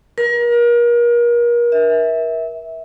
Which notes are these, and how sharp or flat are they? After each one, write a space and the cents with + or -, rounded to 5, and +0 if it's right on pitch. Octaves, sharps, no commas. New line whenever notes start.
A#4 +35
E5 -20